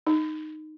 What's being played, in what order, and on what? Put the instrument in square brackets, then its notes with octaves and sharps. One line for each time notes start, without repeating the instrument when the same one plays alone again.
[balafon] D#4